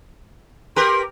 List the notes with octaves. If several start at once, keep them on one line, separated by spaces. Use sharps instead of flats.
G4 A#4 B4 C6